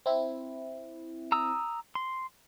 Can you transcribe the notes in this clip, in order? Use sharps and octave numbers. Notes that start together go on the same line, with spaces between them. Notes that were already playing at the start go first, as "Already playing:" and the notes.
C4 E4
A#5 D#6 E6
C6